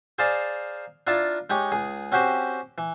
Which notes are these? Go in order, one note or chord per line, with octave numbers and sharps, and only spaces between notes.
G#4 C5 D5 F5 A5 A#5
D4 E4 F4 F5 A5 A#5
G#3 D#4 G4 C#5
C#2 G#4
C4 C#4 F#4 G4 C5
E3